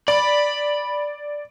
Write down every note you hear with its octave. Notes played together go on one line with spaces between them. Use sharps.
D5 B5